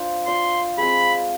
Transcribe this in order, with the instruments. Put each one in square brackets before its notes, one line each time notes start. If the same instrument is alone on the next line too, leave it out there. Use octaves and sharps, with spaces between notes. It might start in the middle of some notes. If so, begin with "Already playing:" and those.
Already playing: [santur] D4 F4 C5
[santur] D4 F4 C5 [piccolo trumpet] C6
[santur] G#3 C4 F4 G#4 [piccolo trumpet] B5